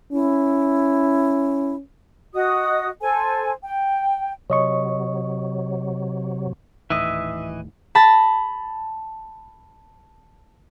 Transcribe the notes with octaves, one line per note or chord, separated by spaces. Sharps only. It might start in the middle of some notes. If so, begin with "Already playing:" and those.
C#4 E4
F#4 D#5 D#6
A4 C5 G#5
G5
C3 F#3 C#5 D#5 C#6
D#1 A2 D#3 E3 D#5 E5
A5 B5 A6 A#6